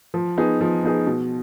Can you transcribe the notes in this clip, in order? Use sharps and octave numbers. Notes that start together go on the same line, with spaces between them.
F3
B3 D#4 G#4
F3
B3 D#4 G#4
B2